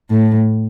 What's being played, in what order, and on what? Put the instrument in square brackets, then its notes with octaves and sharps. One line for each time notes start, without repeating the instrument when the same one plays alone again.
[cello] A2